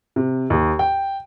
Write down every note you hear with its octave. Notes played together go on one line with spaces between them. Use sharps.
C3
D#2
G5